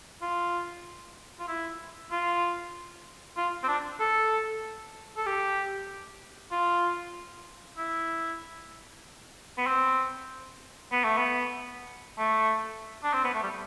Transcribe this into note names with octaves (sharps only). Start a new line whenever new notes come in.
F4
F4
E4
F4
F4
C4
D4
A4
A4
G4
F4
E4
B3
C4
B3
A3
B3
A3
D4
C4
B3
A3
G3